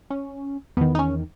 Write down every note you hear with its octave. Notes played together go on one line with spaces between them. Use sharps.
C#4
E2 D#3 B3
D#4
C#4